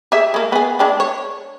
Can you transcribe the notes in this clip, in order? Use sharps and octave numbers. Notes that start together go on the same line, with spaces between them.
G4 G#4 E5
G#3 A#3
B3 G#4
G#3 D4 G4
C#5